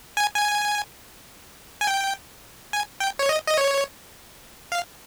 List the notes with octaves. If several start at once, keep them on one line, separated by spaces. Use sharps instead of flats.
G#5
G#5
G#5
G5
G#5
G5
C#5
D#5
D#5
C#5
F5